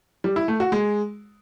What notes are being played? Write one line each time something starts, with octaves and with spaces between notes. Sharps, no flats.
G3
E4
A3
F#4
G#3